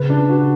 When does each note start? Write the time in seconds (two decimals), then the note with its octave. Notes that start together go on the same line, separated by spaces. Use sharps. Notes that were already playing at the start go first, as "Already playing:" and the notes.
Already playing: C#3 B4
0.10 D4
0.29 F#4